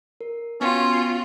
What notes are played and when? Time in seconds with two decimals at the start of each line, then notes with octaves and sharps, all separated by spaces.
0.21 A#4
0.61 B3 C#4 F4 F#4 G5 C6